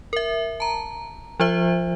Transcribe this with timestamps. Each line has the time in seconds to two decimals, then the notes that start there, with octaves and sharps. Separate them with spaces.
0.13 A#4 E5
0.60 A5 A#5
1.40 F3 F4 C5 E5